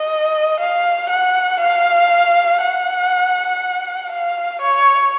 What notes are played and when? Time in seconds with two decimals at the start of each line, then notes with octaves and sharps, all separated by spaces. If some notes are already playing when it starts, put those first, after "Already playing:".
Already playing: D#5
0.61 F5
1.10 F#5
1.60 F5
2.61 F#5
4.12 F5
4.62 C#5